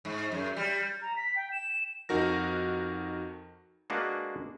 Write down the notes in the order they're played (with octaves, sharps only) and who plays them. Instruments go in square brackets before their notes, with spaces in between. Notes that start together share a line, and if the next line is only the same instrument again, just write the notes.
[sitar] G#2
F#2
G3
[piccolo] A#5
B6
G5
E7
[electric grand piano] F2 D#4 F#4 A#4 A#6
[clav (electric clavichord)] G#3 A#3 D4 F#4 B4 F5